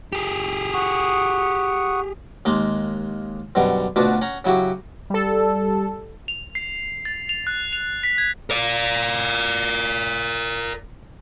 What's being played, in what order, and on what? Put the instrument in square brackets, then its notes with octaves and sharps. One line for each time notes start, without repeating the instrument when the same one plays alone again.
[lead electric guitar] G4 G#4
[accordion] F#5 C#6 D#6
[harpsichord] D#2 G#3 A#3 C6
F#2 B2 D3 G3
D2 B2 D4 F4 F#4 B4
C#4 F#5 A#5
C#3 F#3 E4 F#4 G4
[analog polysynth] G3 A4
[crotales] F7
C7
A6
F7
F#6
F7
B6
G#6
[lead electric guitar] A#4 D5